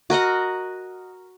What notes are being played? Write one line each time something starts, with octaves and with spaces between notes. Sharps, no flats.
F#4 A#4 D#5 F#5